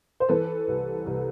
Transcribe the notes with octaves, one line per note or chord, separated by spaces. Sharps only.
C5
E3 A4 B4
C2
C2